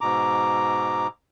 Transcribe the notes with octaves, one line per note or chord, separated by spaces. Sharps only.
G#2 B2 A#5 D6